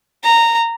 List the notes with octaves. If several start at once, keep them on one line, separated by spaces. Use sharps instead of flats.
A#5